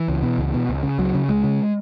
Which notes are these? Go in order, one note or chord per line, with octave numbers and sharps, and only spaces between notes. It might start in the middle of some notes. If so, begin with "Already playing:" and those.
Already playing: E3
C#2
B2
C#2
B2
C#2
C#3
C#2 F#3
C#3
C#2 G#3
C#3